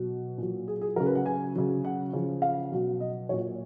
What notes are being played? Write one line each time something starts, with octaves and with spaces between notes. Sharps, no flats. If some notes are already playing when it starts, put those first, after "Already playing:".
Already playing: B2 F#3
A#2 F#3
G#4
G#4
C#3 F#3 A#4
B4
F#5
G#5
C#3 F#3
F#5
C#3 F3
F5
B2 F#3
D#5
A#2 F#3 C#5